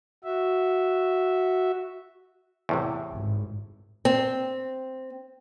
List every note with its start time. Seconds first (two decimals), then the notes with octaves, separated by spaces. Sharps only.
0.24 F#4 E5
2.69 E2 A2 C3
3.13 G#1
4.05 C4